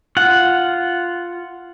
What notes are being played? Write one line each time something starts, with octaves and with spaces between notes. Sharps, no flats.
F4 F#5